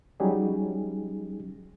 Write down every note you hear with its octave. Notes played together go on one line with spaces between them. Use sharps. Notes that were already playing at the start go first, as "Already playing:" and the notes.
F#3 G3 C#4 D#4 G4 G#4